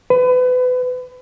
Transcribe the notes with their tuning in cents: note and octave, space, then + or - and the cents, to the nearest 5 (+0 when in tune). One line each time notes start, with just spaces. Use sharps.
B4 +30